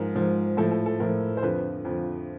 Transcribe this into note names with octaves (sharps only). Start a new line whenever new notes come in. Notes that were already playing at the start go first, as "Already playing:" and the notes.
Already playing: G#2 F3 A#4
G#2 F3
A2 F3 A4
A4
A4
A2 F3 A#4
C5
F2 D3 F3 B4
F2 D3 F3